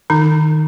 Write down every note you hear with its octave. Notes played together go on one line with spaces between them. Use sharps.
D#3 D#4